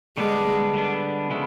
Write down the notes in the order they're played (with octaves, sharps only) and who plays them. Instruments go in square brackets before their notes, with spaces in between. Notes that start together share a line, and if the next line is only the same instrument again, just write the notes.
[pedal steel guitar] D3 G3 B3 D4 [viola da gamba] G#3
[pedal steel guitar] D3 G3 B3 D4
C#3 F3 G#3 B3 E4